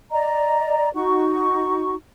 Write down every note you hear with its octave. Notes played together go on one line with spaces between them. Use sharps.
D5 D#5 A#5
D#4 F#4 C#6